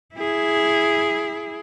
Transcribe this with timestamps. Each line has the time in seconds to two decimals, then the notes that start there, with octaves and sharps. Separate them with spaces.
0.15 E4 G#4